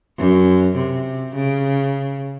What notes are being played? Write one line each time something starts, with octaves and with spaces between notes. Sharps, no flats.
F#2
C3
C#3